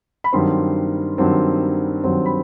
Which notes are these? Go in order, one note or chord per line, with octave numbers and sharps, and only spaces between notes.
B5
G2 D#3 F#3 C4 C6
G2 D#3 F#3 C4
G2 D#3 F#3 C4
B5